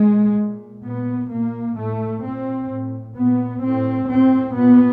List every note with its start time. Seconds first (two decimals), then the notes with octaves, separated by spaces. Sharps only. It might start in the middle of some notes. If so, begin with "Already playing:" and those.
Already playing: A#2 G#3
0.38 A#2
0.83 A#2 B3
1.30 A#2 A#3
1.77 A2 A3
2.23 A#2 C4
2.70 A2
3.16 A#2 B3
3.62 A2 C4
4.08 A2 C4
4.55 A#2 B3